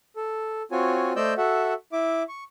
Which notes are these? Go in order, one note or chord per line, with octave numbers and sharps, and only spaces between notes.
A4
C4 F4 F#4 C#5 G#5
A3 C5 D5 D#5 E6 G6
F#4 A4 E5 F#5
E4 E5 D6
C#6